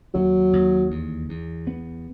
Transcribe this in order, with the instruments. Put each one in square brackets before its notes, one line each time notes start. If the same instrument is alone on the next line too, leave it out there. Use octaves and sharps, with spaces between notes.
[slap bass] D#2 [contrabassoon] F#3
[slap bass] D#2
E2
E2
B3